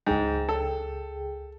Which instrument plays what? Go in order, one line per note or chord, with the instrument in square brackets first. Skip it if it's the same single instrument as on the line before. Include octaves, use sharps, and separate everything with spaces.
[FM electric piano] C#2 G#4 G5 [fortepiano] G#2
[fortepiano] A4